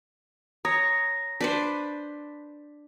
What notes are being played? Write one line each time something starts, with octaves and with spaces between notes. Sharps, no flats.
C#5 A#5 D#6 A#6
D4 B4 C5 B6